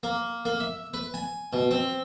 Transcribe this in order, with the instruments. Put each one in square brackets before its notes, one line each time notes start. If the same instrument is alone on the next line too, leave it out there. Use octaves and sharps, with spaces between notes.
[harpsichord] A#3
A#3
E5
B4
G#5
B2
C4